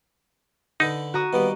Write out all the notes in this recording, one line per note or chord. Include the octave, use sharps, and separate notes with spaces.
D3 D#4 A4 B4
F#4 A#5 D#6
D#3 G3 A#3 B3